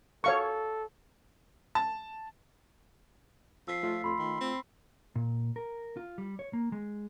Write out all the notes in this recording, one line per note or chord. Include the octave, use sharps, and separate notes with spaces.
A4 C#5 F5 C#6
A5
F3 E6 B6 C7
A3 F4
F2 B5 C6
D#3
C4
A#2
A#4
F4
G3
C#5
A#3
G#3